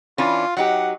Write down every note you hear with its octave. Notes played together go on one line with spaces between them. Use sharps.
E3 C#4 D4 F4
F#3 D#4 G4 F#5